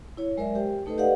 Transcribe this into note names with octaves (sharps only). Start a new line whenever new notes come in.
E4 C#5
F#3 G#3 A#4 C5 D5 E5
G4 C5 G5
A3 D#4 A4 B4 C5 D#5
G4 B4 D5 D#5 F5 F#5